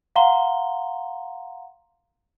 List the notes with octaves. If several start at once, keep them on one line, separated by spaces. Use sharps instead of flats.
F5 F#5 A#5 C6 G7